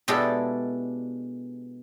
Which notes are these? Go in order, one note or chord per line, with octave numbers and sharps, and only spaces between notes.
B2 G#3 D4 E4 G4 A4